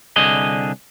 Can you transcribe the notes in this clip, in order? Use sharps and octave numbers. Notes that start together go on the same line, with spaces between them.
C2 D3 G#4 D#5